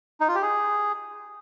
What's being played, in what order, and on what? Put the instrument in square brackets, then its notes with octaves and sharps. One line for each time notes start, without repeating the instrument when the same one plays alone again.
[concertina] D#4
F4
G4
G#4